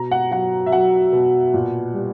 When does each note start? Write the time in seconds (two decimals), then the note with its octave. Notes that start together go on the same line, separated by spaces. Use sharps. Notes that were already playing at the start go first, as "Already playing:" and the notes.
Already playing: B2 A#5
0.11 F#5
0.31 F#3 F#5
0.66 E5
0.72 F#3 F#5
1.13 B2
1.54 A#2
1.94 G3